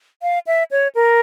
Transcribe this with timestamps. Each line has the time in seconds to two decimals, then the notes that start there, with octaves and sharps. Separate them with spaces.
0.22 F5
0.47 E5
0.71 C#5
0.95 A#4